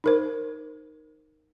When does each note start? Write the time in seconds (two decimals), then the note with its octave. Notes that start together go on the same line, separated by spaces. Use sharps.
0.04 D#4 A#4 C5